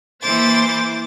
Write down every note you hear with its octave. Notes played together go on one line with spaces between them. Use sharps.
E3 A#3 C5 D6 A6